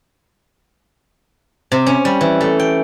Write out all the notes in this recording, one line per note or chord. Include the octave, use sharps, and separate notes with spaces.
C3
C#4
G3
E3
A3
G5